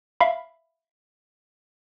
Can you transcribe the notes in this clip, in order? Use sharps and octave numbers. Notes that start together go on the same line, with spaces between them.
E5 F5 B5